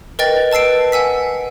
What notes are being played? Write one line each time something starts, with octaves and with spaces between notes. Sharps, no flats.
A#4 B4 D#5 G5 A6
B4 A5 E6 C7 D7
F#5 G#5 E6 B6